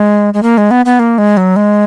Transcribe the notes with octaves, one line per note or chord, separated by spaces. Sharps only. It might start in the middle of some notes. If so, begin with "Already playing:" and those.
Already playing: G#3
G#3
A#3
G#3
B3
B3
A#3
G#3
F#3
G#3